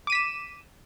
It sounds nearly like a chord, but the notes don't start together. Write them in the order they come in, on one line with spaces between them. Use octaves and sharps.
D6 D#7 B6 E7